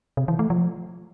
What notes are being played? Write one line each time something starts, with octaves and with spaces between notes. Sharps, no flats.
C3
E3
A3
F3